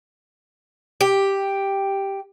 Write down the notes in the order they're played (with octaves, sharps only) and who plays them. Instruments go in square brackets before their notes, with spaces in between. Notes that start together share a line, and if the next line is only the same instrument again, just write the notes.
[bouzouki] G4